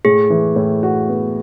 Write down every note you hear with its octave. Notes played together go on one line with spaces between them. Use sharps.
A2 G#4
E3
A2
F#4
B3